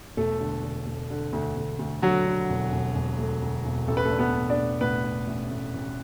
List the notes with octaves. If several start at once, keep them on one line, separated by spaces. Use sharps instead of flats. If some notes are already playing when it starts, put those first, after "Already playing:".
E1 A3 A4
D3
D3
A3
D3
D2
D2
D2
D3 F#3 F#4
D3
E1
E1
E1
A3
D2
E1
A1 A4
B4
A3 A4
D4
B3 B4
A1
D4 D5
A3
A2 B3 B4
D4
A1
A1
A1